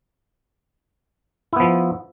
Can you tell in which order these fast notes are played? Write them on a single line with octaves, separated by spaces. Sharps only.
E4 B3 F3